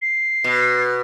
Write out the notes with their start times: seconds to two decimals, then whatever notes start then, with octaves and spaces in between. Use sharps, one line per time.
0.02 C7
0.44 B2